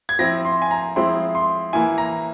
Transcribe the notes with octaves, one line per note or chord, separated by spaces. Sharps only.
G#6
F3 C4 E4 A#6
C6
G#5
A#5
F3 G#3 C4 E4 C6
C6
E3 A#3 E4 G#5
A#5